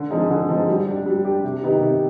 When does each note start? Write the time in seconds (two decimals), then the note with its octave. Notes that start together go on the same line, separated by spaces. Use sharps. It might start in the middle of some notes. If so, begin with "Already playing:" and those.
Already playing: D3
0.11 F3 C4 D#4 G#4
0.30 D3
0.49 F3 C4 D#4 G#4
0.68 G3
0.87 D4 G4
1.06 G3
1.25 D4 G4
1.43 C3
1.63 D#3 B3 D#4 G4
1.81 C3